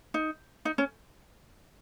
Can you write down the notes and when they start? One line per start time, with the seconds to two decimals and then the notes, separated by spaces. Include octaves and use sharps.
0.14 D#4
0.65 D#4
0.78 C#4